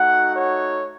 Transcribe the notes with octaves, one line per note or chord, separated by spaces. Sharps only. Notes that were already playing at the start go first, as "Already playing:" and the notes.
Already playing: A3 D#4 F#4 F#5
C#5